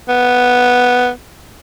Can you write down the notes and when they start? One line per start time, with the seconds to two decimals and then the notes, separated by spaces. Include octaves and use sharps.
0.08 B3